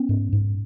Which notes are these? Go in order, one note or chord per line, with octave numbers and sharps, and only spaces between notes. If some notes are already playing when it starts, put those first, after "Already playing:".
Already playing: B3 C#4
G#2
G#2